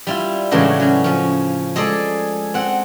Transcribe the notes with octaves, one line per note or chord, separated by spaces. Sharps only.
G3 E4 F4
A2 C#3 E3 F#3 G#3 D4
F#3 C#4
F3 C#4
G#3 G#4 A4 D5
C4 F#5